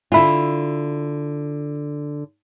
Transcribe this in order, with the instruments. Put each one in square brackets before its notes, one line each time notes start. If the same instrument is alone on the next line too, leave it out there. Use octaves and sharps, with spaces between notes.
[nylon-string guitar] D3 F4 [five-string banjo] E4 G#5